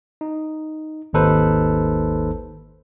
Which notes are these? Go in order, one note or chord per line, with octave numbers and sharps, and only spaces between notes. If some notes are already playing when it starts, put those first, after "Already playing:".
D#4
G#1 D#2 D#4 A4 B4 C5